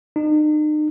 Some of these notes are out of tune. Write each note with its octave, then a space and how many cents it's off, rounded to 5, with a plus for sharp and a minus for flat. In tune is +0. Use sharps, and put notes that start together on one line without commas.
D#4 -40